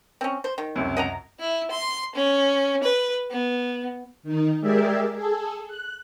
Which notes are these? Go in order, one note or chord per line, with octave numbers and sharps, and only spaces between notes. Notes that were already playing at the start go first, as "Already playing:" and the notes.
C4 C#4
C5
D#3
C#2 F#2 C3
D#5 F#5 A#5
E4
C6
C#4
B4
B3
D#3 D#4
G#3 G4 G#4 A#4 D5 E5
G#4 A4
F#6